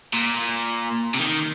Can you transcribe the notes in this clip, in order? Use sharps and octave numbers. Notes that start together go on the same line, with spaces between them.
A#2
C3
D#3